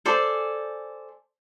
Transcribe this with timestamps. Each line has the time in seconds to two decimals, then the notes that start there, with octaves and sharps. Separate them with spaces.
0.05 A4 C5 D5 G#5